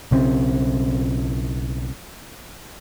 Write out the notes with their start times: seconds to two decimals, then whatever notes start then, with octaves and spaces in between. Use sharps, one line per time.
0.11 B1 C#3 C4